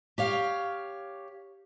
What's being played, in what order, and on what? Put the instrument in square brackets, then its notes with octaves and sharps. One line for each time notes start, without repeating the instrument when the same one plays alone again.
[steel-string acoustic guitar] G4 C#5 F5